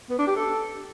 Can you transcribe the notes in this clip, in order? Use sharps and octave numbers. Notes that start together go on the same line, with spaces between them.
B3
D4
G4
A4